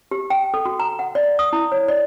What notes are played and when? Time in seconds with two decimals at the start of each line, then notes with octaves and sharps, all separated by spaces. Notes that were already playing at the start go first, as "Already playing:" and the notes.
0.11 G4
0.30 G5
0.54 A4
0.65 F#4
0.80 A#5
0.99 F#5
1.15 D5
1.39 D#6
1.53 E4
1.72 C#5
1.88 D5